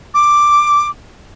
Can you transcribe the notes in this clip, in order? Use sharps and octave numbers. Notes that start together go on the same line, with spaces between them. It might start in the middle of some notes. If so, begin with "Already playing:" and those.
D6